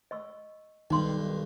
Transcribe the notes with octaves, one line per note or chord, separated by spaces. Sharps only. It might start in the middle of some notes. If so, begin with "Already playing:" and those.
D#5 C#6 E6
B1 G2 D#3 D#4 C6